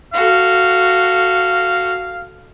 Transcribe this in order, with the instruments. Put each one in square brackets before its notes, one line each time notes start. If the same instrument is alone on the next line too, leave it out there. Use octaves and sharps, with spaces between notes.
[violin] F#4 A4 [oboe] F5